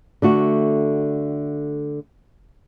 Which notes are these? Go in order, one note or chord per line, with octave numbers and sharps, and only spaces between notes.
D3 A3 F#4